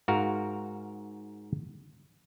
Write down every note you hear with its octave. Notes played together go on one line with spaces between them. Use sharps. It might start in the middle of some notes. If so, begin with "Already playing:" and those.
G#2 F#4 A#4 F5